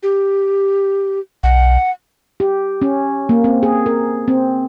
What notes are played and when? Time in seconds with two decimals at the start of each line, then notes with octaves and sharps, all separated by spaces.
0.03 G4
1.43 B1 F#5
2.40 G4
2.82 C#4
3.29 A#3
3.44 C4
3.63 G#4
3.86 A#4
4.28 C4